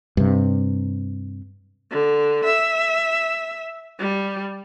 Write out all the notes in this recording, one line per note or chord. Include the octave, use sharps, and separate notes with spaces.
G2 C3
D3
E5
G3